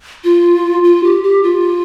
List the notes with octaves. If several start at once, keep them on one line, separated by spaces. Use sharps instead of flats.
F4
F4
G4
G4
F4